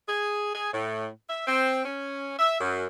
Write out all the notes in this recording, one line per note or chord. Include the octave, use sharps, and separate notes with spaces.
G#4
G#4
A2
E5
C4
C#4
E5
F#2